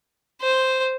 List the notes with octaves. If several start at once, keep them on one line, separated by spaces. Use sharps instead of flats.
C5